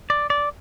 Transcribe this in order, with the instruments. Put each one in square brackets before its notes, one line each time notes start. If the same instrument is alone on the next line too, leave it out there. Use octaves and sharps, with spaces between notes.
[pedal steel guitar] D5
D5